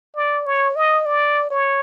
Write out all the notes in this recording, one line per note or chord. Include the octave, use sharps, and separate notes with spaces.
D5
C#5
D#5
D5
C#5